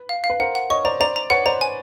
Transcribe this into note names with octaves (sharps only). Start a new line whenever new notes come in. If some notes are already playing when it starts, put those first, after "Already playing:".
Already playing: B4
F5
F5
B4
A#4 C5 F#5
F#5
C#5 D#5 C#6
C5 D5 A#5
C5 D5 A#5
A#5
B4 C#5 F#5
C5 D5 A#5
G#5